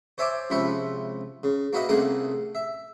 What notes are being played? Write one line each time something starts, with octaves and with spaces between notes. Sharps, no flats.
C5 C#5 E5 G#5 A5 D6
C#2 C3 F3 E5 B5 C#6
C#3
A#3 F#4 B4 D#5 E5 F#5
C2 C#3 A3 A#3 G#4 F#5
E5